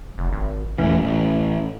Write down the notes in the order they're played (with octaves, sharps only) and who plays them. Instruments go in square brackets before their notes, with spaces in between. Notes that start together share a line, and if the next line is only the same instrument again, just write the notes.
[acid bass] F1
G#1
[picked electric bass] E1 A2 E3 [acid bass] C#4
[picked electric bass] A1